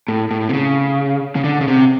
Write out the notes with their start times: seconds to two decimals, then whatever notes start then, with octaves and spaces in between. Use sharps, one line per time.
0.08 A2
0.31 A2
0.49 C3
0.54 C#3
1.36 C#3
1.44 D3
1.61 C#3
1.68 C3